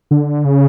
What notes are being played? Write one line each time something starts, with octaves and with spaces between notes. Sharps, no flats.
D3
C#3